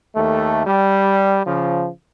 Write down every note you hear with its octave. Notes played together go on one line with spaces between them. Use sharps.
D#2 A3
G3
C#3 F3